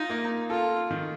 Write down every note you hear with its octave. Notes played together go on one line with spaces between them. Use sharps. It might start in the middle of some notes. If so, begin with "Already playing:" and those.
Already playing: D#4 F4
A#3
F4 A4
D#3